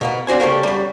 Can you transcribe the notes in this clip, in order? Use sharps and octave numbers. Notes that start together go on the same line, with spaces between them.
B2 A#3 B3
C4 D4 F#4 C5 G#5
C#3 G3 A3 A#3
F#2 G3